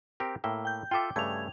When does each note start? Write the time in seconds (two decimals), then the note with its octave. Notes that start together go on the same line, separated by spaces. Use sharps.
0.20 C4 G4 A#4
0.44 A2 A#3 E5 G5
0.65 G5 G6
0.91 F4 A4 E5 G5 D6
1.16 G2 C#3 A3 G#6 F7